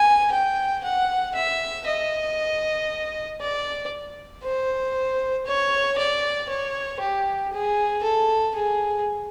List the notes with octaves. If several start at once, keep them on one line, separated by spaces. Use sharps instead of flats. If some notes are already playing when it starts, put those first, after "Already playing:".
Already playing: G#5
G5
F#5
E5
D#5
D5
C5
C#5
D5
C#5
G4
G#4
A4
G#4